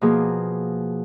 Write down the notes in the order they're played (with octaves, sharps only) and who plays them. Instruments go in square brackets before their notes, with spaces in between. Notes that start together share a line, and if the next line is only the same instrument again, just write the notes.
[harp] B2 F3 A#3 G#4